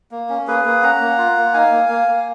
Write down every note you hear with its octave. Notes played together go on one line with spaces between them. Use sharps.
A#3
C#4
A#3 G#4 B4
A#3
C#4 F#5 A#5
A#3
F4
A#3
D#4 F5 G#5
A#3
A#3
A#3